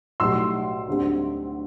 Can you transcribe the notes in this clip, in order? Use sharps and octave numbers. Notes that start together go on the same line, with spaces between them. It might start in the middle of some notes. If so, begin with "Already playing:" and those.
B1 A2 G3 C6 E6
D2 D3 G3 C4